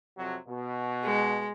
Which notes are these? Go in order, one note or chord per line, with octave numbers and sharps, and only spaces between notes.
F2 C3 F#3
B2
G#3